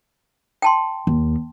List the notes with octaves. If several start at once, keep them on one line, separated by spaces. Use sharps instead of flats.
G5 A5 C6
D#2